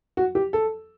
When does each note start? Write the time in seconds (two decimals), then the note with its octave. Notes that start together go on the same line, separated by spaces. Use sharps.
0.17 F#4
0.35 G4
0.53 A4